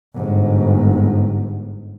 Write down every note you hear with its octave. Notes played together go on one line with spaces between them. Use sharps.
G1 G#2